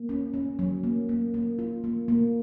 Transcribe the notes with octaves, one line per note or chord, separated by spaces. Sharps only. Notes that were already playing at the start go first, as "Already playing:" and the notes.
Already playing: A#3
C#4
C#4
F#3
A#3
A#3
A#3
F4
A#3
A#3